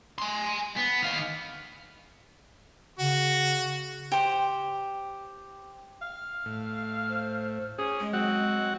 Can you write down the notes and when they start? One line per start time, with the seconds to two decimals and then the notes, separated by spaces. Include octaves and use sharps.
0.18 G#5 C6
0.76 B3
1.02 D#3 F5
3.00 C#3 F#4
4.12 G4 C5
6.02 F5
6.46 A2
7.09 C5
7.79 C#4 G#4
8.00 G#3
8.13 F#3 C4 F#4 F#5